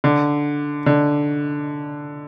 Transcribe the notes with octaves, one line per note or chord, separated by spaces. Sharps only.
D3
D3